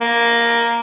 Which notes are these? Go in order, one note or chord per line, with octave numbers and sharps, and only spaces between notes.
A#3